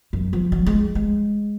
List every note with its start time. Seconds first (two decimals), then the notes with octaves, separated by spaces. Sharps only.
0.13 F#2
0.33 F3
0.52 F#3
0.66 G#3
0.95 G#3